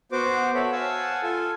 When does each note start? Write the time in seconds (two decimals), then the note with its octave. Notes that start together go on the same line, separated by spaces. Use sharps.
0.12 B3 F#4 C5 D6
0.54 A4 C#5 E5 B5
0.72 F5 F#5 G#5 A5 E6
1.23 F4 A4 G#5